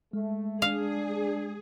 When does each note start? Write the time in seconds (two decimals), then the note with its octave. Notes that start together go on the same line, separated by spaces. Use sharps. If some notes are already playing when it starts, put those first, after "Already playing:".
0.13 G#3 A3
0.62 D4 G#4 F5